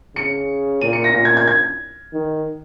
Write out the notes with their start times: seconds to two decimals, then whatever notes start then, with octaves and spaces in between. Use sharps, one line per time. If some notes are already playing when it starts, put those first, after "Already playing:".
0.15 C#3 C#7
0.81 A#2 D#7
0.93 C#7
1.04 A#6
1.15 A#2 A#6
1.25 G#6
1.37 G#6
1.47 G#6
2.13 D#3